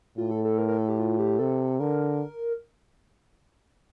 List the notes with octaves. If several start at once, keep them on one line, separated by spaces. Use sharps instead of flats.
A2 F4
A4
A4
A#4
A#4
A4
G4
F4
G4
C3 A4
D3 A#4